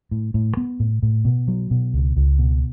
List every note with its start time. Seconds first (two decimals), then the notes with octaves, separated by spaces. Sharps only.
0.11 A2
0.34 A2
0.57 B3
0.80 A2
1.03 A2
1.25 B2
1.48 F#3
1.71 B2
1.93 C#2
2.16 C#2
2.39 B2